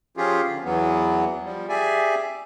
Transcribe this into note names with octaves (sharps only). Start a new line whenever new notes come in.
F3 C#4 F4 G4 G#4
D3
E2 E3 F#3 B3
F3 G3
G4 G#4 D5 E5 G#5